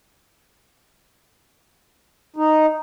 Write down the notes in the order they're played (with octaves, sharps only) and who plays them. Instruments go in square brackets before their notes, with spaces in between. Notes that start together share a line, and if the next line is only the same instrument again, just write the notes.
[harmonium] D#4